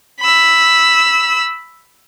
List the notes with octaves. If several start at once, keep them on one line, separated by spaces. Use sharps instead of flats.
B5 E6